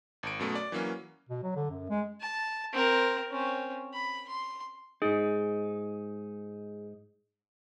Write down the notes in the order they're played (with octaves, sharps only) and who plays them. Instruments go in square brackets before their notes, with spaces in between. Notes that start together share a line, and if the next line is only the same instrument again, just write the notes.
[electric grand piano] G#1 D7
F#2 B2 A3 C#4
D5
E3 F#3 A#3 C#4
[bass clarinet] B2
F#3
D3
F#2
G#3
[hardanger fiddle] A5
C4 A#4
C4 C#4
B5
C6
[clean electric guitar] G#2 D#4 [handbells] G#4